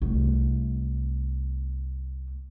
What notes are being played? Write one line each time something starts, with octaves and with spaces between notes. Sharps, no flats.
C2 A3